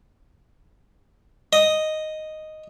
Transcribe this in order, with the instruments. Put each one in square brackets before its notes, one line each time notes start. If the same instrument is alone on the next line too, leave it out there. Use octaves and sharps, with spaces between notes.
[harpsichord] D#5